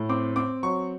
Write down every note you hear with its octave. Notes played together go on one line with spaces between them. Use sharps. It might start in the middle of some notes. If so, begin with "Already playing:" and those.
Already playing: A2
C4 D6
C4 D6
F#3 C#6